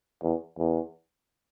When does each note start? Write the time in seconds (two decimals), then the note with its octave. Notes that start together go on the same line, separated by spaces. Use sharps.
0.23 E2
0.58 E2